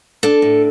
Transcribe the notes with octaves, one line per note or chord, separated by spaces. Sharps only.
D4 A4
A2